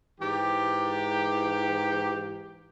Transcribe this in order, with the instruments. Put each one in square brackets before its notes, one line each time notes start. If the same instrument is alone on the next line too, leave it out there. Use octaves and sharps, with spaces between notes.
[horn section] G#2 E3 G4